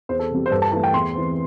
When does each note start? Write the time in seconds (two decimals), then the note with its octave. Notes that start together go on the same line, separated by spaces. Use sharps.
0.09 E2 C5
0.19 A4
0.31 C3 G3
0.46 C5
0.51 G2 A4
0.62 A5
0.72 E3 A3 A5
0.84 G5
0.94 E2 C6
1.15 E3 C4